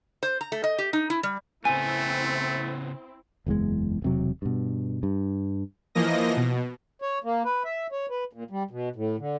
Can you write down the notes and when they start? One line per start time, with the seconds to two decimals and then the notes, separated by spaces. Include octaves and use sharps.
0.23 C5
0.41 A#5
0.52 A3
0.64 D#5
0.78 G4
0.93 D#4
1.10 E4
1.23 G3
1.65 C#3 A3 B3 C4 E4 G#5
3.46 F#1 E2 B2 G#3
4.02 E1 C3 F#3
4.42 G2 B2
5.03 G2
5.95 E3 F3 A#3 D#5 A#6
6.37 B2
7.02 C#5
7.24 A#3
7.45 B4
7.65 E5
7.92 C#5
8.10 B4
8.33 A#2
8.50 G3
8.71 B2
8.96 A2
9.19 D3